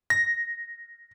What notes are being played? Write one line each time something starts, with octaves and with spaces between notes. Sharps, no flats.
A#6